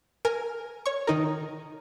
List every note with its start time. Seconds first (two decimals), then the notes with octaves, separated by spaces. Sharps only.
0.25 A#4 G#5
0.86 C#5 C#6
1.07 D#3 D#4 A#4